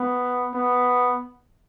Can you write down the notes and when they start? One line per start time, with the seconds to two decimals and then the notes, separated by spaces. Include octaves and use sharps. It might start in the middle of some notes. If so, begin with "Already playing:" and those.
Already playing: B3
0.54 B3